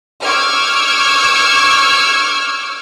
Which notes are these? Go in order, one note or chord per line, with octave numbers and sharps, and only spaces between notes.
C#6 D6 E6 F6 G6 G#6